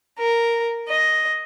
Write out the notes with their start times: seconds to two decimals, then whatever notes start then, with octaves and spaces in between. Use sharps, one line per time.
0.17 A#4
0.89 D#5